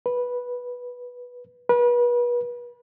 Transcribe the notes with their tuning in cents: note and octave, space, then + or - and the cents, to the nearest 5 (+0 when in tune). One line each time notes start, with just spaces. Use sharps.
B4 -10
B4 -35